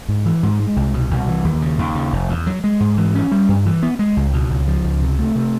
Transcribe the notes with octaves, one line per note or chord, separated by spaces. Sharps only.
G#2
E3
G#2
G#3
C2
B2
C2
E3
D#2
C#3
D#2
C#3
F1
E2
F#3
G#3
G#2
E3
C#4
G3
G2
E3
B3
G#3
C#2
B2
C#2
F3
C#2
C3
A3
C3